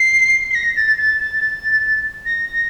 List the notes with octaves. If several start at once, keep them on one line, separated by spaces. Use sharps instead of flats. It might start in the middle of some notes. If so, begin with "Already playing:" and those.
Already playing: C7
C7
A#6
A6
A6
A6
A6
A#6
A#6